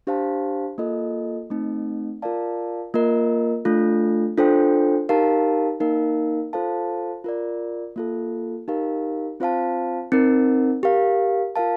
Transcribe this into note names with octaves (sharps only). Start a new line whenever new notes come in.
D4 G4 C5 F5 A5
A#3 F4 A4 D#5
A3 C4 D#4
F4 A#4 D5 F5 A5
A#3 F4 A#4 D#5
A3 D4 F4 A4
D4 F4 A4 C5 G5
D#4 G4 A#4 F5 A5
A#3 D#4 A#4 F5
F4 A4 C5 F5 A5
F4 A#4 D5
A#3 F4 A4
D#4 G4 A#4 F5
C4 F4 C5 F5 A5
C4 D#4 A#4
G4 A#4 F5
F4 A#4 F5 A5